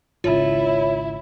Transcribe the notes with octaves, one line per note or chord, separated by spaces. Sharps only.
G#1 C#2 C#3 E4 F4 C#5